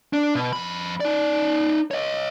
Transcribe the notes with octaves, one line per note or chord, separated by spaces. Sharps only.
D4
B2
F2 B5
D#4 D5
C#5 D#5